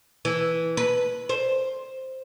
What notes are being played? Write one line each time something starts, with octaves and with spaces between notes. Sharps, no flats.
E3
B4
C5